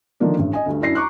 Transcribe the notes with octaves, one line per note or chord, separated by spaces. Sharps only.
D3 D#3 F3 A#3 D4
A1 G2
D#5 G#5
D2 G2
F#2 D4 E4 A#6 C7
A#5 C#6 D6 F#6